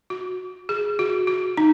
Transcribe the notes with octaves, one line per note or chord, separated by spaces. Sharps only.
F#4
G#4
F#4
F#4
D#4